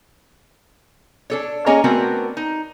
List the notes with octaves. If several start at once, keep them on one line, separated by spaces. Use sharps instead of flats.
D4 A4 C#5
A#3 C#4 G#4 C#5 D#5 A#5
A3 B3 C4 D4 F#4 A#4
D#4